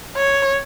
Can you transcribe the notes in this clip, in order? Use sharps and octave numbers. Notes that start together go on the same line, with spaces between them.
C#5